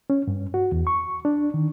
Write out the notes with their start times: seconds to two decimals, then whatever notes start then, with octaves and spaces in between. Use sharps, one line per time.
0.10 C#4
0.27 G2
0.54 F#4
0.72 E2
0.87 C#6
1.25 D4
1.54 D#3